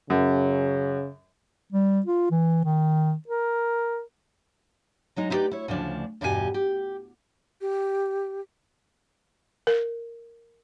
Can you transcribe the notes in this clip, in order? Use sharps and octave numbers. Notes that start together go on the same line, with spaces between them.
F#2 C#3
G3
F4
E3
D#3
A#4
F#3 G#3 D#4
D#4 E4 G4 A4 B4 D5
E4 C#5
D2 C#3 F3 D4
E2 G2 B2 G4 G#4 G#5
G4
G4
A#4